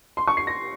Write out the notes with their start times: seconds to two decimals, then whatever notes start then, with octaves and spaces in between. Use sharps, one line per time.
0.17 C6
0.27 C#6
0.37 C7
0.47 A#6